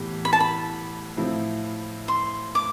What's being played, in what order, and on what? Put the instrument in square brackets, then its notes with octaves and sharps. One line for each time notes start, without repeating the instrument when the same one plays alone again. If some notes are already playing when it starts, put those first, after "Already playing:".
Already playing: [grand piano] A2 E3 B3 G4
[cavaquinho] B5
A5
B5
[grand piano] A2 F3 C4 E4
[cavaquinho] C6
D6